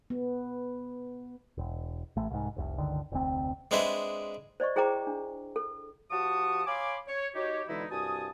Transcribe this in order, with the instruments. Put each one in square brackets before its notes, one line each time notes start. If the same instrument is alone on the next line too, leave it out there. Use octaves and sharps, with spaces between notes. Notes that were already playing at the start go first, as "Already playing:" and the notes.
[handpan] B3
[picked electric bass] E1
A1 A3
C2 G#2
F1 C2
G1 C#2 D3 D#3
F1 D2 C4
[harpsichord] G#3 C4 D4 G#4 B4 E5
[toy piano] C5 D5 D#5 C#6
E4 G#4 C5 G5 A#5 D6
D4
A4
[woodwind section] F3 F#4 G4 A5 C#6 D#6
C#5 F5 G#5 B5 C6 D6
C#5
D#4 F#4 G4 C#5
B2 D3 E3 G#3 D#4 E4
C2 G2 F#4 G#5 A5 D#6